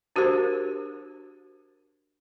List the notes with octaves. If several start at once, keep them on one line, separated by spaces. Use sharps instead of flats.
D4 F#4 G4 A#4 C5